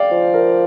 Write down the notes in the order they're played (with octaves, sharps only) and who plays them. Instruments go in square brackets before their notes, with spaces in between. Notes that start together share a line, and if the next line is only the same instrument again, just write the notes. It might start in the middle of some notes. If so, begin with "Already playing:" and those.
Already playing: [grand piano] D5 F5 G5
[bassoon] F3
[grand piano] A#4